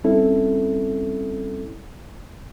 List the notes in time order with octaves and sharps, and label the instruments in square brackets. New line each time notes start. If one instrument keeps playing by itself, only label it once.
[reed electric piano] G3 C4 C#4 E4 A4